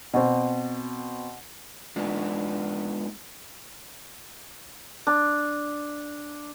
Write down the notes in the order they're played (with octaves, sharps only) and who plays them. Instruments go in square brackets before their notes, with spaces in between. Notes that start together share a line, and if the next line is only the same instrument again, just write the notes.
[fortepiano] B2 C4
[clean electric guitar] G#3 B3 D4 D#4 F4
[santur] D4